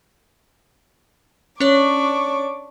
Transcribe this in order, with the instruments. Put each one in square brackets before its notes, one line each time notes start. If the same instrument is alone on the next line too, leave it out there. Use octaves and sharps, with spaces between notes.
[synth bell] C#4 C#5 [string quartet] D4 C#6 D6